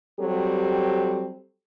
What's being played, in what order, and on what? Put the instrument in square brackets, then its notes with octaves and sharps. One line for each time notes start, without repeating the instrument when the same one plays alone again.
[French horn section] F#3 G3 C4 G4 A4